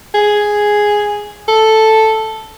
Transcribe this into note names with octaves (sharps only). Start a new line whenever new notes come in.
G#4
A4